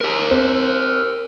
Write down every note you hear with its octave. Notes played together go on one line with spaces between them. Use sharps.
G4 A#4
C4